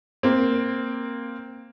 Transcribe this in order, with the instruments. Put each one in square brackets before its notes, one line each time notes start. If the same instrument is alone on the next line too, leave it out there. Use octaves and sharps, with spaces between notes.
[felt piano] A#3 C4